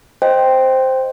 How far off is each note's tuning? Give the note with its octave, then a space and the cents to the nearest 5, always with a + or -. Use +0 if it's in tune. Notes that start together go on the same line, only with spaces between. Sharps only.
C5 +0 D#5 +0 G5 +0